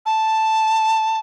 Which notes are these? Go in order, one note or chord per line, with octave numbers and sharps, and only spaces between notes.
A5